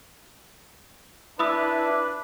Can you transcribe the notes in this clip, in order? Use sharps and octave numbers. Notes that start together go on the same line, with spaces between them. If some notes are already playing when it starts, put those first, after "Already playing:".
D4 E4 B4 B5 D#6 E6